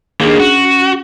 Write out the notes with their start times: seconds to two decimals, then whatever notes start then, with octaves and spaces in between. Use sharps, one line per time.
0.20 D#2 A#3 D4 G#4
0.40 C#4 F#4